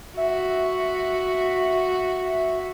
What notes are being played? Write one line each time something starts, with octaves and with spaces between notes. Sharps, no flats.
F#4 E5